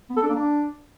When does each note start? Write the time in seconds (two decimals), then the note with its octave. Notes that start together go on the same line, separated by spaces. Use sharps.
0.10 B3
0.16 A4
0.23 D4
0.29 A#3
0.35 D4